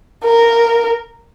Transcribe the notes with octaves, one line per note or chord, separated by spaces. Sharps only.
A#4